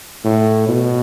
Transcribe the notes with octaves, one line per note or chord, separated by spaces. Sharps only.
A2
B2